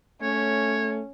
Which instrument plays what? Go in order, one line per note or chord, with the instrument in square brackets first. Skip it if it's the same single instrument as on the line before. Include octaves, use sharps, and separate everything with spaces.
[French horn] A3 [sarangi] C#4 [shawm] C#5